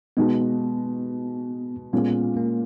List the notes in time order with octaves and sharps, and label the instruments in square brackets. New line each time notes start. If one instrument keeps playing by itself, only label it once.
[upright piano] B2 G#3 D#4 [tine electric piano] B3
[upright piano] A#2 G#3 C#4 [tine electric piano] B3
[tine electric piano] A#3